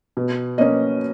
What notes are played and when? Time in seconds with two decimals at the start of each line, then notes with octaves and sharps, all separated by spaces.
0.17 B2
0.58 A#3 C#4 D#5